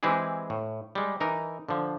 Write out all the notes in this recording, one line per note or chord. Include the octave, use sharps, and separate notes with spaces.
E3 G#3 C4 E4 G4 G#4
A2
G3 G#3
E3 D#4 A#4
D3 F3